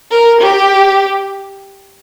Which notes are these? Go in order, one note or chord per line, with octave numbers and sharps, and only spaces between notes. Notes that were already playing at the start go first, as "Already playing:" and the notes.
A#4
G4